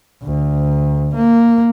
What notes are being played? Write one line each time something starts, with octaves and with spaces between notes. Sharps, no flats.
D2
A#3